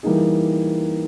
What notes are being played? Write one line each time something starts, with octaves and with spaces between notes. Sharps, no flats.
E3 G3 A#3 D#4 G#4